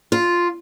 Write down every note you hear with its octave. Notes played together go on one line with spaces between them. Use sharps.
F4